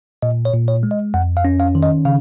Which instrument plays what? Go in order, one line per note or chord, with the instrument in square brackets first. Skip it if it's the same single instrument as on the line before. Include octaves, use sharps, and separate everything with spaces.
[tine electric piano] A#2 D#5
C#5
A#2
C#5
G#3
D#5
F2 F#5
F5
C#4
F5
D#3
D#5
C#3 F5